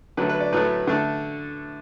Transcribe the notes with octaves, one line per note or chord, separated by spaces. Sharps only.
D3 F#3 A3 B4
B4
D5
A2 F#3 A3 B4
D3 A3